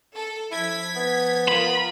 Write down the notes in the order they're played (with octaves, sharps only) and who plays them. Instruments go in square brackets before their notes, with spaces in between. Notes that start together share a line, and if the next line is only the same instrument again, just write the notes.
[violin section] A4
[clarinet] F3 [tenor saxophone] E4 [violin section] G#6 B6
[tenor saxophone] B3
[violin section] F4 A#4 [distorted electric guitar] B5